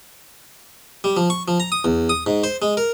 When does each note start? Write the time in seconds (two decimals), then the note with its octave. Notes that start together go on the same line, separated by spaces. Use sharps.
1.04 G3
1.17 F3
1.30 C#6
1.48 F3
1.60 A#5
1.72 D#6
1.85 E2
2.09 D#6
2.27 G#2
2.44 C5
2.62 G#3
2.77 A#4